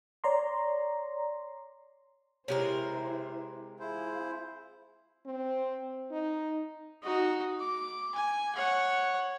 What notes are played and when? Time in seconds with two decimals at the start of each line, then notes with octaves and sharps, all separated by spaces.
0.24 C#5 D5 A#5 C6
2.48 C3 G#3 E4 G4 A#4 C5 C#5
3.80 E4 F4 G#4 C5
5.26 C4
6.11 D#4
7.03 D#4 F#4
7.60 D6
8.15 G#5
8.55 C#5 F#5